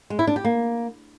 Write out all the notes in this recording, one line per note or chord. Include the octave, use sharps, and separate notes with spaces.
G#3
E4
D4
G4
A#3